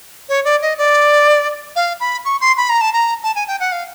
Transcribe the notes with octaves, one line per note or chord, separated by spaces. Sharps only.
C#5
D5
D#5
D5
F5
B5
C#6
C6
B5
A#5
A5
A#5
A5
G#5
G5
F#5
F5